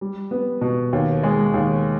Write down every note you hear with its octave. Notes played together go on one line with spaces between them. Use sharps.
G3
B3
B2
D#2
G#3
D#2